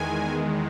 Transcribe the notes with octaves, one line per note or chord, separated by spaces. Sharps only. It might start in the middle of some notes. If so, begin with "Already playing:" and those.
Already playing: E2 D#3 G#3 G#5